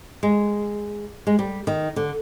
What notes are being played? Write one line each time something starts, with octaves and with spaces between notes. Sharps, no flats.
G#3
G#3
G3
D#3
D3